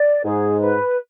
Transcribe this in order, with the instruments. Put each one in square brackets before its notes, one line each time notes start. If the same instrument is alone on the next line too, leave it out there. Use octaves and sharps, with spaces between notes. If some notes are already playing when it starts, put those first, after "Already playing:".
Already playing: [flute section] D5
[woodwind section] G#2 [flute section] G#4
[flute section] B4